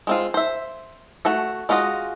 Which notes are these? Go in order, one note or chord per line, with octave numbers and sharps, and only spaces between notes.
G#3 C4 F4
C5 E5
A3 F#4 A4
G#3 F4 F#4 A#4 D#5